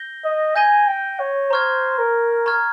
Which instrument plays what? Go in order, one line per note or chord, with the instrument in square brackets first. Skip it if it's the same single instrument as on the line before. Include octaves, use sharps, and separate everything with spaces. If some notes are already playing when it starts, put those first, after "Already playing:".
Already playing: [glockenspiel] G6 A#6 G7
[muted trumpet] D#5
[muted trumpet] G#5 [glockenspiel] G6 A#6 D#7 G7
[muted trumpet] G5
C#5
[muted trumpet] C5 [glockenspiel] A#5 C#6 F6 G#6
[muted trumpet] A#4
[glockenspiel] A#5 C#6 F6 G#6